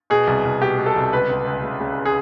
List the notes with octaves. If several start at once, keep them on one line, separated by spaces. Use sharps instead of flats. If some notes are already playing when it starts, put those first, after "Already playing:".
B2 G#4
C2
C2
B2 G4
B2
A4
C2
C#2 B4
C#2
C#2
C#3
C#3
G#4